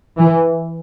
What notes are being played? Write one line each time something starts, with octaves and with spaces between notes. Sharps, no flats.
E3